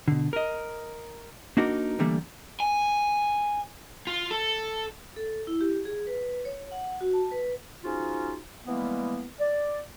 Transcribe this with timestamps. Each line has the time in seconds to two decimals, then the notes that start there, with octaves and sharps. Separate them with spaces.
0.08 B2 D3
0.33 A#4 D#5
1.57 A#3 D4 D#4 F#4 A#4
1.99 D3 E3 G3 A3 A#3
2.60 G#5
4.07 F4
4.31 A4
5.16 A4
5.47 E4
5.61 G4
5.85 G#4
6.07 B4
6.45 C#5
6.72 F#5
7.01 F#4
7.13 A5
7.31 B4
7.84 F3 C#4 D#4 F4 F#4 G#4
8.67 E3 G3 G#3 A#3 B3
9.40 D5